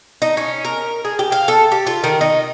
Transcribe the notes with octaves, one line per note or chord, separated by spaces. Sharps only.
D#4
C#4
A#4
G#4
G4
F5
A4
G4
F4
D#3
D#4